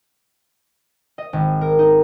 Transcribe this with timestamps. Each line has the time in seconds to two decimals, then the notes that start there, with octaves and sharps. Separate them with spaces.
1.18 D#5
1.33 G#1
1.61 A#4
1.79 D#4